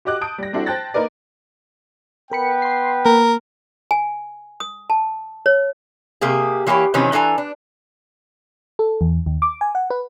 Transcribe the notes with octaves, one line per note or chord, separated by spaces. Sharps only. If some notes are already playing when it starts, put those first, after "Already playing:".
F#4 G4 D#5 D6 F#6
A5 D#6 G6 D7
G3 A#6
G3 C4 D4 E4 F#4 A4
C5 G5 A5 F#6 A6 A#6
A#3 D#4 A#4 B4 D5
B3 A#4 B4 G5 B5 C#7
C6 C7
A#3 A#4
G#5
D#6
A5
C#5
C3 A#3 G4 G#4
E3 A#3 G4 A#4 C#5
C3 D#3 E3 F#3 C4 C#4
E3 D4 A4 G#5 A#5
D4
A4
E2
D#2
D6
G#5
F#5
B4